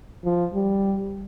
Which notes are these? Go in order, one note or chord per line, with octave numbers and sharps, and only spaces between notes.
F3
G3